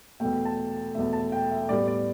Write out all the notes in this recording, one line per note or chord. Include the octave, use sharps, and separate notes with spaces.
E2 B2 A3 G5
A5
E2 B2 A3 E5
A5
G5
E5
A2 G3 B3 D5
D5